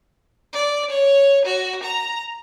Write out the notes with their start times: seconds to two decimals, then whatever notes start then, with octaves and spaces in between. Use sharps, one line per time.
0.53 D5
0.89 C#5
1.45 F#4
1.83 A#5